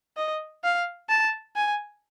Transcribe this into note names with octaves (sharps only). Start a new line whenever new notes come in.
D#5
F5
A5
G#5